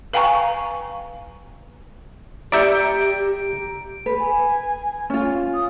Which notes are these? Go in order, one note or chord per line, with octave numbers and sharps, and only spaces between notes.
B4 F5 G5 G#5 A#5 C#6
G4 D5 E5 A#5 G6 C#7 D7
B4
G#5
C#4 F4
D#6